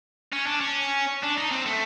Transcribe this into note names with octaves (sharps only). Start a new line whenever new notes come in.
C#4
D4
C#4
D4
D#4
C4
A3